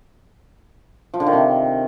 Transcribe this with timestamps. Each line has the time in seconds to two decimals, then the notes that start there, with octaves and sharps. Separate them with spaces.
1.14 F3
1.20 D3
1.27 D#3
1.33 C3